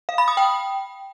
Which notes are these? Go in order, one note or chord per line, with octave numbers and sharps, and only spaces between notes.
F5
B5
D#6
G5